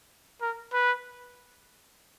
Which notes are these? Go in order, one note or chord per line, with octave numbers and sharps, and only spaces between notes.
A#4
B4